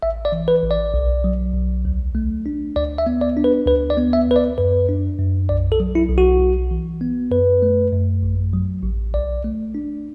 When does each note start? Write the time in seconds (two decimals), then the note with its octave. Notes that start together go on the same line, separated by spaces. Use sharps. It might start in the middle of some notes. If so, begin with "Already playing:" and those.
0.03 A1 E5
0.25 D5
0.32 E3
0.48 B4
0.63 A1
0.71 D5
0.94 B1
1.24 F#3
1.54 B1
1.85 D2
2.15 A3
2.46 D4
2.76 D2 D5
2.98 E5
3.06 B3
3.21 D5
3.37 D4
3.44 B4
3.67 D2 B4
3.90 D5
3.97 B3
4.13 E5
4.28 D2 B4
4.36 D5
4.58 F#2 B4
4.89 D4
5.19 F#2
5.49 B1 D5
5.72 A4
5.80 F#3
5.95 E4
6.10 B1
6.18 F#4
6.41 B1
6.71 E3
7.01 B3
7.31 F#2 B4
7.62 A3
7.92 F#2
8.23 A1
8.53 F#3
8.83 A1
9.14 B1 D5
9.44 A3
9.75 D4